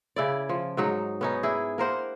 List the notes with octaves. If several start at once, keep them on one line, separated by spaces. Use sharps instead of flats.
C#3 E4 D5
F3
G#2 F#3 D#4
B3 C#4 D#4
D4 E4 G#4
A#3 A#4 C5 F#5